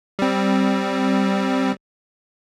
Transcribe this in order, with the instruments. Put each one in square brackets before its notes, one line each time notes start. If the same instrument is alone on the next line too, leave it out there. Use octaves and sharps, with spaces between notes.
[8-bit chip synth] G3 C4